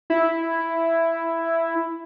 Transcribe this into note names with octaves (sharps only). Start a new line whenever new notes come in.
E4